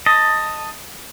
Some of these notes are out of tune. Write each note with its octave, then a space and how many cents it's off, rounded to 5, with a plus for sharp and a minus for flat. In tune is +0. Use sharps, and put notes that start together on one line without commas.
D#5 +0 A5 +15